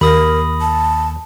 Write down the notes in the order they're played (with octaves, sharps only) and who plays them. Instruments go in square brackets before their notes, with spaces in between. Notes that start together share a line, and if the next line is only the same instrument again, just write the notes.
[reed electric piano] D#2 [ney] A#4 [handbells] B5 D#6 A#6
[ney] A5